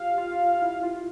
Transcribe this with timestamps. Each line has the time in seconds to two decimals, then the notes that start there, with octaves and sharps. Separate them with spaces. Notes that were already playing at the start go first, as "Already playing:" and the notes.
Already playing: F4 G4 F5
0.18 F4
0.62 E4
0.83 F4